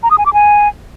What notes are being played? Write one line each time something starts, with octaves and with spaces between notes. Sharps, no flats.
A#5
D#6
G#5
D6
G#5